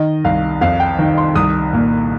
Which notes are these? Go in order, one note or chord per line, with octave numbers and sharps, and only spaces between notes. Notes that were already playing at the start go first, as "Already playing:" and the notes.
Already playing: D#3 D#5
C2 F5
F2 F5
G5
D#3
C6
C2 D#6
A#2